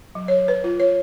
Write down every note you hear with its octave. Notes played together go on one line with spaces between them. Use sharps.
F#3
C#5
B4
F4
C#5